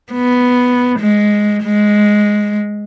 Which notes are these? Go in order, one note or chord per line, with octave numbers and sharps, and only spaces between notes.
B3
G#3
G#3